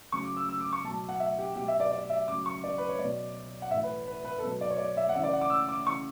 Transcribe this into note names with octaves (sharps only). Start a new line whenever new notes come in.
C#3 F#3 C#6
D6
E6
E6
D6
C#6
B2 F#3 A5
F#5
E5
G4
B2 F#3 G4
E5
D5
D5
E5
C#3 F#3 D6
C#6
D5
B4
C#5
B2 F#3 D5
F#5
A2 E3 E5
B4
B4
B4
A4
B2 F#3 B4
D5
C#5
D5
E5
F#5
C#3 E3 E5
D5
F#5
D6
E6
D6
C#3 E3 C#6